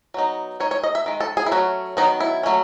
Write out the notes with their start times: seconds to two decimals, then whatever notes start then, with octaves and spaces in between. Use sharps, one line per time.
0.14 F#3 B3 D#4
0.60 G#3 D#4 C#5
0.71 C#5
0.83 D#5
0.95 E5
1.06 D#3 G#3
1.20 A4
1.37 G#4
1.46 E4
1.52 F#3 A3 C#4 F#4
1.97 D#3 F#3 B3 D#4
2.20 E4
2.43 F#3 A3 C#4